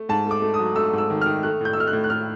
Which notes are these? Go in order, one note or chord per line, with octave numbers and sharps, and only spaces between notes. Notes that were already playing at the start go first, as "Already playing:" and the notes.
Already playing: A3
G#2 A5
A3 D6
A3
D#6
F#3
A3 E6
G#2
E6
D#3
D#3 F6
A3 F#6
A2 G6
E6
A3 F6
F#6
A2
F#6
A2 F6